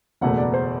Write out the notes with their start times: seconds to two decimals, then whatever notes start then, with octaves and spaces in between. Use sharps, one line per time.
0.21 F#1 E2 B2 A3 F#5
0.38 D5
0.54 C5